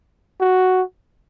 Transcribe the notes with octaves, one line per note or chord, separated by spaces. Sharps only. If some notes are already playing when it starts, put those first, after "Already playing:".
F#4